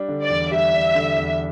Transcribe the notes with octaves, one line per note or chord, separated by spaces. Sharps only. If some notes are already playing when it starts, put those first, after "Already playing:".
Already playing: G3 D4
D3
D5
E2
G3 E5
D4
D3
E2